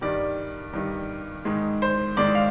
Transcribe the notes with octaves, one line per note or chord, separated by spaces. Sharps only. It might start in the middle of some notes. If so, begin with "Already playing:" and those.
G2 D#3 G3 D5
G2 D#3 G3
G#2 D#3 G#3
C5
G#2 D#3 G#3 D5
F5